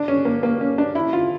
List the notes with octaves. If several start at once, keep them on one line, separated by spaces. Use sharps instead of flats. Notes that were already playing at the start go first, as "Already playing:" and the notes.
Already playing: D4
C#4
A#3
A#3
C#4
D4
E4
F4